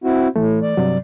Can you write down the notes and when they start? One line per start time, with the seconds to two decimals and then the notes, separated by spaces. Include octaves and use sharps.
0.04 C4 E4 F#4
0.36 A2 E3 A3
0.63 D5
0.77 G2 C3 F#3